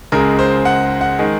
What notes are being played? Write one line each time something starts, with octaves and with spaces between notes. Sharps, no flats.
C#2 C#3 G#3 A#4
C5
F#5
F#5
D#3 G#3